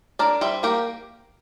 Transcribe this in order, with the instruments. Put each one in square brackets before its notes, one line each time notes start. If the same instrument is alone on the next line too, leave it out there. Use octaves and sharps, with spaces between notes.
[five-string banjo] D4 A#4 D5
G3 C5 E5
A#3 G4 A#4